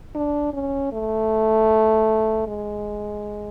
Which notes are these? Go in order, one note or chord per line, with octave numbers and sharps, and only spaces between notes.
D4
C#4
A3
G#3